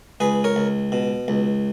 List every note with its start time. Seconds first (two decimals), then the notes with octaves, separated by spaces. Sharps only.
0.20 C#2 G#4 B4
0.44 A#4 C#5
0.56 C#2
0.92 B2
1.28 C#2